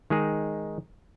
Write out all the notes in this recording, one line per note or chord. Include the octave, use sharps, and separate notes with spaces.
D#3 G#3 D#4 G#4